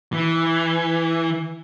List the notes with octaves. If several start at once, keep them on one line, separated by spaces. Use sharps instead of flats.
E3